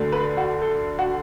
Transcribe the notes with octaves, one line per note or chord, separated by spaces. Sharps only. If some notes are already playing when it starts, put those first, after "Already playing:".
Already playing: D2 D3 A3
B4
F#4
A4
F#4